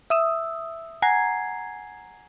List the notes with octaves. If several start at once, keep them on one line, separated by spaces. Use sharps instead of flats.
E5 D#6 E6
F#5 G#5 A#5 G#6 C7